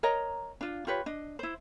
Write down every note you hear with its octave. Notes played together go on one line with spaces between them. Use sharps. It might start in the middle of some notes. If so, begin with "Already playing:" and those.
A#4 C#5 D#5 A#5
D4 F4
F4 G4 B4 C#5
D4 D#5
E4 C5